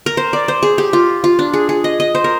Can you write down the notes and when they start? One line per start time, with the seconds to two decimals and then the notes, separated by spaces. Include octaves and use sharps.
0.06 A#4
0.17 C5
0.33 D5
0.48 C5
0.63 G#4
0.78 G4
0.93 F4
1.24 F4
1.39 D4
1.54 G#4
1.69 G#4
1.84 D#5
2.00 D#5
2.15 C5
2.24 A#4